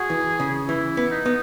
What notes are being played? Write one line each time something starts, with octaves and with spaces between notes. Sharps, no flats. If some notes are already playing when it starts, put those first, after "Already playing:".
Already playing: F#4 G#4
E3
C#3
E3 E4
B3
D#4
B3